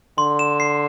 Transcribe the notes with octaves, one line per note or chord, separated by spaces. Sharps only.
D3 C6
E7
C7